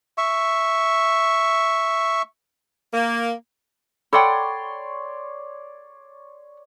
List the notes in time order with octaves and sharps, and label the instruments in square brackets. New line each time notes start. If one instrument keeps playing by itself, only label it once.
[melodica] E5 C#6
[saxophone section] A#3
[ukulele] A4 F#5 G5 [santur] C#5 D5 C6 [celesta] B5